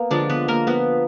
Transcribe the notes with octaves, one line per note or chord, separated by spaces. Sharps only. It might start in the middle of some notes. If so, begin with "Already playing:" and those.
Already playing: A#3 B3
D3 F3 G#3 D4 D5
B3 B4
A#3 A#4
F3 A#3 B3 B4